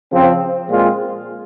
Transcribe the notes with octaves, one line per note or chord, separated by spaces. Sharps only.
C#3 F3 C4
A#2 G#3 C4 F4